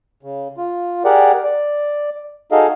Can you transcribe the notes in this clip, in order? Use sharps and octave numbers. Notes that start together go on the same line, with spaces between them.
C#3
F4
G4 G#4 A#4 D5 F#5
D5
D#4 F#4 G#4 A4 D#5 F5